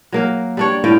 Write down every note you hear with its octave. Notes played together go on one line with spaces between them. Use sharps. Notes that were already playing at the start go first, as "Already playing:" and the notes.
F#3 A#3 A#4
G3 D4 C#5
A2 F4 G5